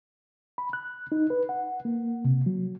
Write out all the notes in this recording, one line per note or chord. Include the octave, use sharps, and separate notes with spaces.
B5
F#6
D#4
B4
F#5
A#3
C3
F#3